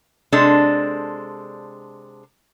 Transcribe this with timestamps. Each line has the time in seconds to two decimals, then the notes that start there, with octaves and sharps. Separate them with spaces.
0.32 C3 G#3 D4 A4